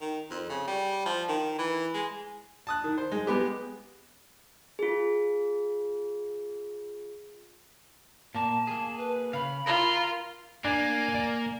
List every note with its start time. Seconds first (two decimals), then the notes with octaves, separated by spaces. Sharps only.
0.01 D#3
0.30 F2
0.49 C#3
0.67 G3
1.06 F3
1.29 D#3
1.58 E3
1.94 G#3
2.67 A5 D#6 F#6
2.84 D#3
2.98 C5
3.12 G#3
3.27 G#3 B3 G4
4.79 F4 G#4
8.35 A#2 A#3 A5
8.67 A#3 G#4
8.98 B4
9.33 C#3 F5 B5
9.66 F4 A#4
10.65 A#3 D4 G#5
11.14 D5